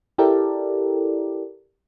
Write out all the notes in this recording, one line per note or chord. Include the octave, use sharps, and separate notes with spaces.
E4 G4 A4 A#4 D5